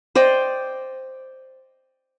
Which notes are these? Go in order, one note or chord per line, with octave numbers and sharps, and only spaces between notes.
C5 D5 D#5 G5